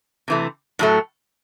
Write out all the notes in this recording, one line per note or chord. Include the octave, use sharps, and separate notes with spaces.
C3 E3 A3
A2 F#3 A3